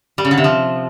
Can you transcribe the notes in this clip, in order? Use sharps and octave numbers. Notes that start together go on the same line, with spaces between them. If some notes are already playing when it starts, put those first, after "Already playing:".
G3
C#3
D3
C3
F3